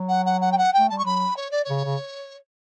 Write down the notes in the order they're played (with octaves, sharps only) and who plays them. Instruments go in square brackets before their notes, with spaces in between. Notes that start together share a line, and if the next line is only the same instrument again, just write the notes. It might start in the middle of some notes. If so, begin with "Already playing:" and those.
Already playing: [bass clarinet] F#3
[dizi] F#5
F#5
F#5
G5
F#5
G5
[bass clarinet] A3
[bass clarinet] G3 [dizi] A5
[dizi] C#6
[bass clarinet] F#3 [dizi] B5
[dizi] C#5
D5
C#5
[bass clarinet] C#3
C#3